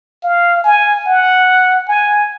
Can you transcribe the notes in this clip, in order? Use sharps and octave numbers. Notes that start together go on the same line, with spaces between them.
F5
G#5
F#5
G#5